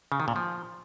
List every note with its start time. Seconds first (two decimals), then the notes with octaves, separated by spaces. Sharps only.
0.12 C#3
0.20 D#3
0.28 A#2
0.36 F3